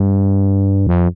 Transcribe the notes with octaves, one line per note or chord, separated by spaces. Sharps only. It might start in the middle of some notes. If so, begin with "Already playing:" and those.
Already playing: G2
F2